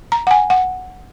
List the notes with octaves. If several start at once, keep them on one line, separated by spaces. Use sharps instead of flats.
A#5
F#5
G#5
F#5